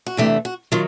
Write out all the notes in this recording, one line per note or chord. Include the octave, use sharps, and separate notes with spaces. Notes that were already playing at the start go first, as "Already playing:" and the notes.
F#4
E2 C3 E3 A3 D4 G4
F#4
D#3 F#3 F4